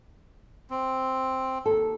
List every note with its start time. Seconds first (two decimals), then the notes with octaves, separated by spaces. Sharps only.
0.70 C4
1.66 D#2 A4